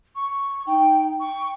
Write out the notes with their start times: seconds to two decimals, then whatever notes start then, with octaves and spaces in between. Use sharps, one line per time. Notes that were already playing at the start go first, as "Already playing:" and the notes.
0.16 C#6
0.67 D#4 G5
1.20 G5 C#6